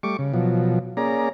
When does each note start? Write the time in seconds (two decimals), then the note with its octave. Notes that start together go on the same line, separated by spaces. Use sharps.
0.03 G3 A3 C#6 D6
0.19 C#3
0.34 B2 F3 F#3
0.97 A#3 C#4 G#4 D5 A#5